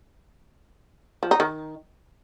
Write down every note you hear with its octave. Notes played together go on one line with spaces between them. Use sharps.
F3
D#4
D#3